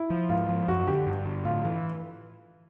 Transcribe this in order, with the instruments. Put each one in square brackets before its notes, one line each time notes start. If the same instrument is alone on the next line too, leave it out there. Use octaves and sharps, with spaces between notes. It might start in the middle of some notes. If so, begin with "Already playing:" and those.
Already playing: [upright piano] E4
[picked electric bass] F3
[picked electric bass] G#2 [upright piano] F4
[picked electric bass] F3
[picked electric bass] F#2 [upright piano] F#4
[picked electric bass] D3 [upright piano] G4
[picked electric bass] G2
D3
[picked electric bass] A2 [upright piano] F4
[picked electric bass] E3